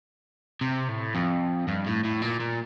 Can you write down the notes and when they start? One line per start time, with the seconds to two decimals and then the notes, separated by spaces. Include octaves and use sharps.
0.61 C3
0.88 A2
1.15 F2
1.68 G2
1.86 A2
2.04 A2
2.22 A#2
2.40 A#2